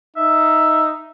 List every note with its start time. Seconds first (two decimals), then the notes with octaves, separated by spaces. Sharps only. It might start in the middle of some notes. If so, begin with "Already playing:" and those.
0.16 D#4 E5